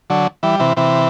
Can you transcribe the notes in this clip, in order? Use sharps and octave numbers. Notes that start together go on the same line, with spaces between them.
D3 F#3
E3 G3
C3 E3
C3 E3